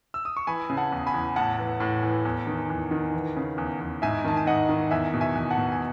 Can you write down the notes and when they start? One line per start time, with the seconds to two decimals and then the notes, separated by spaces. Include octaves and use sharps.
0.14 E6
0.25 D#6
0.37 C#6
0.47 E3 G#5 B5
0.70 C#3
0.77 F#5 A5
0.92 E2
1.06 G#5 B5
1.14 E2
1.36 A2 F#5 A5
1.59 E3
1.80 A2
2.03 E3
2.25 E2
2.47 D#3
2.70 E2
2.91 D#3
3.14 E3
3.36 C#3
3.58 E2
3.81 E2
4.02 G#2 E5 G#5
4.24 D#3 A5
4.37 G#5
4.47 G#2 D#5 F#5
4.69 D#3
4.91 E2 E5 G#5
5.14 B2
5.21 E5 G#5
5.35 E2
5.50 F#5 A5
5.58 B2
5.72 G#5